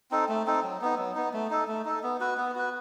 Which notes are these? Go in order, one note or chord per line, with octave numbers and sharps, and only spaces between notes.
C4 D#4 A4
A3
C4 D#4 A4
F#3
B3 D#4
F#3
B3 D#4
A3
D#4 A4
A3
D#4 A4
B3
F#4 B4
B3
F#4 B4